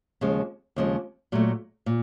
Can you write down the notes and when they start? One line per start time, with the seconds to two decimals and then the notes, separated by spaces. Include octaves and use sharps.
0.21 D#2 C#3 F3 G#3
0.76 D#2 C#3 F3 G#3
1.32 A#2 F#3 A3
1.86 A#2